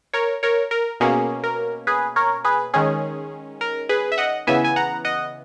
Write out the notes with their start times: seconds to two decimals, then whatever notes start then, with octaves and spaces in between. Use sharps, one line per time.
0.13 A#4 C#5
0.43 A#4 C#5
0.71 A#4
1.00 B2 A#3 C#4 G#4
1.44 A#4
1.87 G#4 B4
2.16 A#4 C#5
2.44 G#4 B4
2.74 D#3 G#3 C#4 G#4
3.61 A#4
3.89 G#4 B4
4.12 E5
4.18 D#5 F#5
4.47 C#3 E3 B3 E5 G#5
4.64 G#5
4.76 F#5 A#5
5.05 D#5 F#5